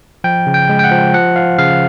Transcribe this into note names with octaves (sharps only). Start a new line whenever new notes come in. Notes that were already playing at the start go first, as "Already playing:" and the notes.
F3 G5
C#3
G5
G#3
G5
F#5
F3
F3 F#5
F3 F5
C#3 F5